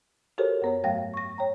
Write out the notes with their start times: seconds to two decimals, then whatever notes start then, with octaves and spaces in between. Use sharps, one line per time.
0.38 F#4 G4 A4 A#4 C5 C#5
0.62 F#2 B3 C#5
0.84 G#2 F#3 A3 F5 G5 A#6
1.14 C#6 A#6
1.38 C#5 G5 A#5